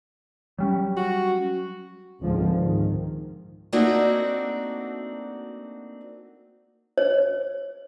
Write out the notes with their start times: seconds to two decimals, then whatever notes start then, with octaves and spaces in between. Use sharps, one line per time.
0.59 F#3 G3 C#4
0.97 F#4
2.22 C#2 G#2 D3 F3 G#3 C4
2.55 G#2 D#3
3.72 A3 A#3 C4 D4 D#4 F#4
6.98 C#5